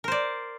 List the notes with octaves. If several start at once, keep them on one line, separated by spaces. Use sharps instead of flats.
A#4 C5 D5